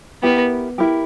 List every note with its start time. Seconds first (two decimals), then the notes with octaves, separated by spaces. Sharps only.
0.23 B3 E4 G4 A#4
0.78 E4 G4 A#4